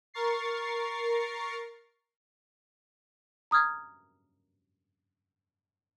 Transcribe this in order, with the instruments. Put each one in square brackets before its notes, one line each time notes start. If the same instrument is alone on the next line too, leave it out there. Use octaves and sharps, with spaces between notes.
[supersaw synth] A#4 C#6 A6 C7
[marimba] A#5 D#6 F6 G#6